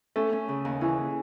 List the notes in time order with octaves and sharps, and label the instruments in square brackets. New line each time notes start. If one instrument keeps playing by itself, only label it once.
[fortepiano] A3 [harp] C#4
[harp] C#4
C#3
D#2
[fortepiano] E3 [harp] C#4